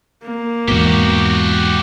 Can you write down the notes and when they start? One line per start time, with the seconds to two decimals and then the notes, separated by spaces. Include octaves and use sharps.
0.24 A#3
0.68 E2 G#2 B2 F#4 G4